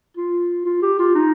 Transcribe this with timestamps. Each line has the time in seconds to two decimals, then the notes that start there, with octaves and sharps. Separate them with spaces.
0.17 F4
0.66 F4
0.82 G4
0.99 F4
1.15 D#4